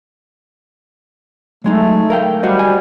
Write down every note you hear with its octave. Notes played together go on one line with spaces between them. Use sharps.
F#3 G#3 A3 D#4
A#4 F5 G5
G3 F#4 C5 D#5
G#5